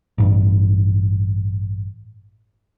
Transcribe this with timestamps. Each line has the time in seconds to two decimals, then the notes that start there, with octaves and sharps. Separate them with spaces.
0.18 A1 G2